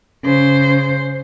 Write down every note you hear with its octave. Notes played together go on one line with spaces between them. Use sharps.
C#3 C5